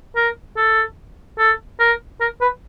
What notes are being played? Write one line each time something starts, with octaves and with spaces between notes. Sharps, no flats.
A#4
A4
A4
A#4
A#4
B4